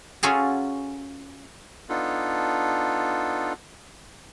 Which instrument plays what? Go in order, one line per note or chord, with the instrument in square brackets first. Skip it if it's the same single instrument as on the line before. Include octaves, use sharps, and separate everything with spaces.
[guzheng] C#4 F4 F#4 G#4 A4 A#5
[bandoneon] B3 D4 D#4 F4 A4